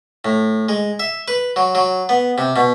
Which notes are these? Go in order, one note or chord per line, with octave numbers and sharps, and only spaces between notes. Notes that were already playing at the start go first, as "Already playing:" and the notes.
A2
G#3
E5
B4
F#3
F#3
B3
C3
B2